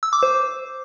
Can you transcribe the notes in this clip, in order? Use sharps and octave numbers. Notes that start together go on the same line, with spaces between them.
E6
D6
C5